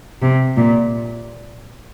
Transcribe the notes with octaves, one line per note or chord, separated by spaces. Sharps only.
C3
A#2